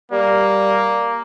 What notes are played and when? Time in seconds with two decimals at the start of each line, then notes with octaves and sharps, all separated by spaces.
0.12 G3 A#3